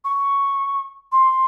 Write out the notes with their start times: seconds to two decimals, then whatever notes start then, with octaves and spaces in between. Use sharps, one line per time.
0.04 C#6
1.12 C6